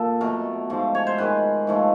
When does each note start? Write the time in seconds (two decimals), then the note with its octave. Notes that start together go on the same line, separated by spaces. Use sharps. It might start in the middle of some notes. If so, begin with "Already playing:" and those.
Already playing: A#2 A4
0.21 B2 F#3 A3 A#4
0.70 G#2 F3 A3
0.95 C#5
1.07 C5
1.18 G#2 D#3 G#3 B4
1.67 G#2 F3 A3